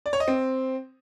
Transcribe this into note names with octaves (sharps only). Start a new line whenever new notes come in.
D5
C#5
D#5
C4